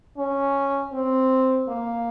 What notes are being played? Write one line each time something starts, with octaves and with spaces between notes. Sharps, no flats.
C#4
C4
A#3